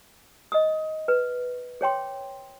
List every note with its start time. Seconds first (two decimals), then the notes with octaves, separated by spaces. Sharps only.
0.52 D#5 D#6
1.08 B4
1.81 G#4 C#5 G5 C6